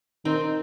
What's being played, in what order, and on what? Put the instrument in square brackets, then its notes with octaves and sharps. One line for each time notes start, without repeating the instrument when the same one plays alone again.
[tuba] D#3 [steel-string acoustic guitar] C4 D#4